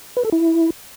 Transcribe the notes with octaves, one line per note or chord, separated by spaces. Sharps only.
B4
A4
E4